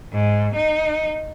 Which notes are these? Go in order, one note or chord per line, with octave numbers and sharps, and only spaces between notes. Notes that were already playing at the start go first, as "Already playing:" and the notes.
G#2
D#4